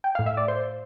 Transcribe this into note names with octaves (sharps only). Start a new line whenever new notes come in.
G5
A2 F5
E5
D5
C5